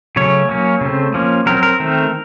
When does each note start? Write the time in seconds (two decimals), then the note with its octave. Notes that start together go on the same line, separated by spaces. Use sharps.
0.16 C#3 F#3 A3 C#4 C#5
0.49 F#3 A#3 C#4
0.81 C#3 A3 C4
1.14 F3 A#3 C#4
1.46 F#3 C4 A#4
1.63 A#4
1.80 D#3 A3 C4